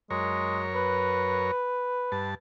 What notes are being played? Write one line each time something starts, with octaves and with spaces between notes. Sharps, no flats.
F#2 G#3 A#4 C#5
B4
G2 A5